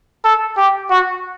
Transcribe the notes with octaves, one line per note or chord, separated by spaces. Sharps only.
A4
G4
F#4